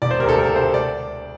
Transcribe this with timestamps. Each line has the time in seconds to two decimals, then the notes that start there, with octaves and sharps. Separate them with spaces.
0.02 E1 D5
0.11 C5
0.20 C3 A#4
0.24 D2 A4
0.37 E1 A#4
0.56 D2 C3 C5
0.74 D5